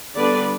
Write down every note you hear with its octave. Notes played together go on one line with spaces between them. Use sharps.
D3 G3 B3 D4 B4 D5